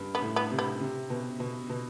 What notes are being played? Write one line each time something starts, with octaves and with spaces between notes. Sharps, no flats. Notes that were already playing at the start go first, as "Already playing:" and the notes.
Already playing: G2
B3
A2
B3
C3
B3
C3
B2
B2
B2